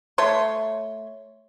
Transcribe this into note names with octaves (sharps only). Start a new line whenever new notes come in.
A3 C#5 C6